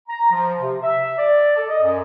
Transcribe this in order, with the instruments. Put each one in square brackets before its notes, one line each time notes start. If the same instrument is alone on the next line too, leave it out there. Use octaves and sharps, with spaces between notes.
[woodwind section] A#5
F3
C3
E5
D5
A4
D#5
F#2